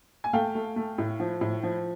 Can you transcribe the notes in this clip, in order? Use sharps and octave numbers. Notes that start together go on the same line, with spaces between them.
G#5
A3 F5 G5
A3
A3
A2
F3
A2
F3